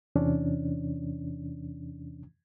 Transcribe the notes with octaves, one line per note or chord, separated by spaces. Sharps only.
E2 C3 E3 C#4 D4